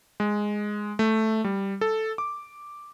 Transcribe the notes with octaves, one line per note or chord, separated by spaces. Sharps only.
G#3
A3
G3
A4
D6